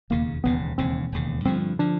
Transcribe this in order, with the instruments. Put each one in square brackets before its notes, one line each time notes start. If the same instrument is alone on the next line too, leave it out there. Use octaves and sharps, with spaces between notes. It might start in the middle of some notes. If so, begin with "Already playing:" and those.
[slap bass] E1 D#2 C#3 [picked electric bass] A#3
[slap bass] E1 D#2 C#3 [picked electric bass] B3
[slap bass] E1 D#2 C#3 [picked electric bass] C4
[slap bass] E1 D#2 C#3
[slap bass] G2 D3 F3 [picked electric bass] C4
[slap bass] D3 F3 [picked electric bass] D4